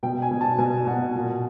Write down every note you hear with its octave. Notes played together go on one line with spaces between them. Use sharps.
B2 G5
G#5
B2
A5
B2 G#5
B2 F#5
A#2